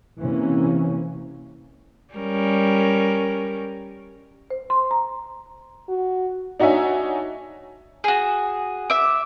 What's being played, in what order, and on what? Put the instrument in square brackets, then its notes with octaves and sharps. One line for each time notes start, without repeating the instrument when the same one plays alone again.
[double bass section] C3 E3 A#3 C#4
[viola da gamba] G3 C#4 A#4
[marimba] C5
C6
A#5
[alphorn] F#4
[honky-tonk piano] D4 D#4 F#4 C#5 E5 G#5
[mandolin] F#4 G#4
E5 D6